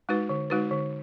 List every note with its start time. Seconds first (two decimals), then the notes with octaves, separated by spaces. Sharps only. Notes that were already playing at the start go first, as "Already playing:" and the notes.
0.09 G#3 D#4 F#4 B4
0.29 D3
0.50 G#3 D#4 F#4 B4
0.71 D3